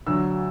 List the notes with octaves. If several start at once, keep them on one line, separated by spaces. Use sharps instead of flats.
D2 D3 F#3 E6